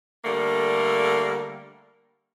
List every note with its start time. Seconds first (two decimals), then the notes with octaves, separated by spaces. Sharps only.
0.25 D3 G3 A3 A#3